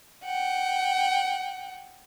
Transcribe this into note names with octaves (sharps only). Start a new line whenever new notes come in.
F#5 G5